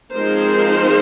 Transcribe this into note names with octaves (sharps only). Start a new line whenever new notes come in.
F3 G#3 C4 D#4 A#4 C5